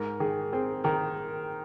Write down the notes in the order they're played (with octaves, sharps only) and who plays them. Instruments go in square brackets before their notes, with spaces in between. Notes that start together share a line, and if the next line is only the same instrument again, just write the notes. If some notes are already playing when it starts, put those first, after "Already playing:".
Already playing: [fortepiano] G#2 [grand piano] A#4
[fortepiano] D#3 [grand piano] G#4
[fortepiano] C4 [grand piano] G#4
[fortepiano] D#3 [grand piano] A#4